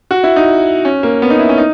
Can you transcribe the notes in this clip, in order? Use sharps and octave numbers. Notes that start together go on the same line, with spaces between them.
F#4
E4
D#4
C#4
A#3
B3
D#4
E4
C#4
D#4